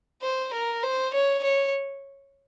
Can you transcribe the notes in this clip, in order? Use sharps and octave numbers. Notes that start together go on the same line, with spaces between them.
C5
A#4
C5
C#5
C#5